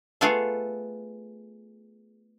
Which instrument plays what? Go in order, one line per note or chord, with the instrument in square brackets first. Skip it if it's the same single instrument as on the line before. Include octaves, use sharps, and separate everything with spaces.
[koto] A3 B3 F4 G#4 A4